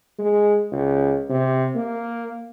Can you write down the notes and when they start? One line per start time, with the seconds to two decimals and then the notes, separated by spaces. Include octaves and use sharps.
0.19 G#3
0.72 C#2
1.30 C3
1.75 A#3